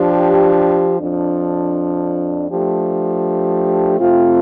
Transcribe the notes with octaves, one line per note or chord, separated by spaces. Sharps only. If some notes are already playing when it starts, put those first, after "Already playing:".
Already playing: F3 D4 G4
F2 F3 D4
F3 A3 D4 G4
C3 A3 C4 F4